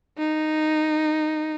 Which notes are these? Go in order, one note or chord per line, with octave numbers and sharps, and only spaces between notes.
D#4